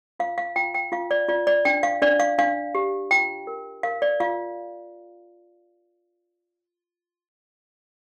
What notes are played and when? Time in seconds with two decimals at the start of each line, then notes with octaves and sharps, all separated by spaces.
0.20 F4 F5
0.38 F5
0.56 F4 G5
0.74 G5
0.92 F4 F5
1.11 D5
1.28 F4 D5
1.47 D5
1.65 D4 G5
1.83 F5
2.02 D4 D5
2.20 F5
2.38 D4 F5
2.75 G4
3.11 F4 G5
3.47 A#4
3.83 A#4 F5
4.02 D5
4.20 F4 F5